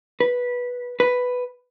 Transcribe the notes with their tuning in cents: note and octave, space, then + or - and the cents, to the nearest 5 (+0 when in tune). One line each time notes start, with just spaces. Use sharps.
B4 -10
B4 +5